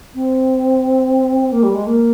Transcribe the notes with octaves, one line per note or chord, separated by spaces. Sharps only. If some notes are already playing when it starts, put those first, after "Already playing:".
C4
A#3
G3
G#3
A#3